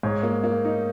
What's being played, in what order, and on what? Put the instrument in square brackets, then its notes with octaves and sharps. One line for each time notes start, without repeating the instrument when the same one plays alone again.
[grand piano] G#2 [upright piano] C#5
[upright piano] A#3
A#3
D#4